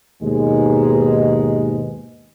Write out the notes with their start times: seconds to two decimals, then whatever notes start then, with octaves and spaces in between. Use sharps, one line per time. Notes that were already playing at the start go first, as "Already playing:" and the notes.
0.22 D#2 G#2 B2 G#3